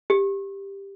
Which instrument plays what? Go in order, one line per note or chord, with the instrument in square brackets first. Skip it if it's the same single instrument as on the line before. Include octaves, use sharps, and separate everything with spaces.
[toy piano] G4